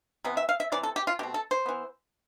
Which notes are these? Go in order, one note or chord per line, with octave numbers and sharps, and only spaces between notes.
C3 E3 B3
E5
F5
E5
C3 E3 D5
A4
G4
F4
B2 A3 C4 G4
A4
C5
E3 B3